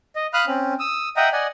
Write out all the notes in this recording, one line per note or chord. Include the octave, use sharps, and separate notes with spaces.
D#5
F5 B5 D#6 F6 F#6
C4 C#4
D#6 E6
D#5 E5 F#5 G5 A#5 D#6
D5 D#5 F#5 G#5